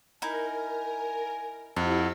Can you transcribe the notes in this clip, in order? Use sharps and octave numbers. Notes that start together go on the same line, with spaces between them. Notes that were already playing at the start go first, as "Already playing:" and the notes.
D#4 E4 A#4 G#5
F2 E4 G4 F#5 E6